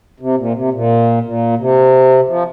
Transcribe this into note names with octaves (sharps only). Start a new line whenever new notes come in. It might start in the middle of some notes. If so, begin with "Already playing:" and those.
C3
A#2
C3
A#2
A#2
C3
F3